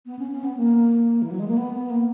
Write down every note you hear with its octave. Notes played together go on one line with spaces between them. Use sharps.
B3
C#4
C#4
B3
A#3
E3
F#3
G#3
A#3
B3
B3
A#3